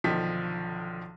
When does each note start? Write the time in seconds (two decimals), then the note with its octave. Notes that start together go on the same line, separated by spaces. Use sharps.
0.04 B1 D3 D#3 F3 B6